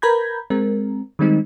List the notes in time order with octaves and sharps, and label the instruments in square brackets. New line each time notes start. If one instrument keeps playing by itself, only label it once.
[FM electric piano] A#4 B4 A#5 B5 G6 G#6
G#3 C4 A#4
D#3 G3 G#3 C4 D#4